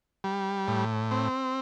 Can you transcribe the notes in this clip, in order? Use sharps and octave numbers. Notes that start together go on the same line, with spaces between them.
G3
A2
C4